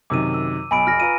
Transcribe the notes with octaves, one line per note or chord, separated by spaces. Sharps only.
F#2 C3 D#3 D6 E6 D#7
E6
B1 G#5 B5 D7
F1 F6 A#6
F4 B4 A#5 D#7